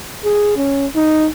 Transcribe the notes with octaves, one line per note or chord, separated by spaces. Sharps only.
G#4
C#4
D#4